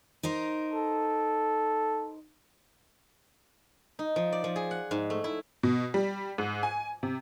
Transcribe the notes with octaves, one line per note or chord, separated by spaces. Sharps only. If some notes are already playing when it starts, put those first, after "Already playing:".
D#4 A#4 C5
A4
D#4
F3
D5
F3
G#4
F#5
G#2
A3
E4
B2
G3
G#2
G#5
C3